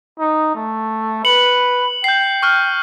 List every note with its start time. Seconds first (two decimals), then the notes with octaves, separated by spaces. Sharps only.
0.20 D#4
0.55 A3
1.25 B4 C#7 F#7
2.04 G5 G6 C7
2.43 C#6 F6 F#6